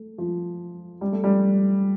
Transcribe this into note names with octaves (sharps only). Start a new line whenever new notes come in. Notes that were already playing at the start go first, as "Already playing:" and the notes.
Already playing: A3
F3
G3
A3
G3